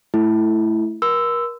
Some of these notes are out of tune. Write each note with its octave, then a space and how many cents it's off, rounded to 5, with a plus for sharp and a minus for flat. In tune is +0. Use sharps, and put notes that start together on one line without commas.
A3 -5 E4 +5
A#4 +35 C6 -40 E6 +0